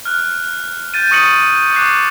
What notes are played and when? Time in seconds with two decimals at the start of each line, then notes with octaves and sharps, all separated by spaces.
0.05 F6 F#6
0.94 G6 A6 D#7
1.11 C#6 D#6 A#6 C#7 D#7 F#7
1.73 D6 F#6 C7